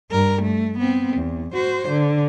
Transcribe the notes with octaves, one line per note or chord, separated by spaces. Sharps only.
G2 A#4
A3
B3 C4
E2
F#4 C5
D3